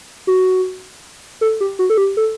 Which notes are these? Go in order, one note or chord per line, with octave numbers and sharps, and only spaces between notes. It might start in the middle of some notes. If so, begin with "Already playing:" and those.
F#4
A4
G4
F#4
A4
G4
A4